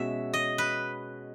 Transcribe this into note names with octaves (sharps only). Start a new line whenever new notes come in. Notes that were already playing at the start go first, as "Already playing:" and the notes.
Already playing: B2 G#3 C#4 F#4 E5
D#5
B4